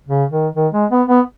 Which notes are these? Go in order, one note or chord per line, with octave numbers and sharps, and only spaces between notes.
C#3
D#3
D#3
G#3
B3
B3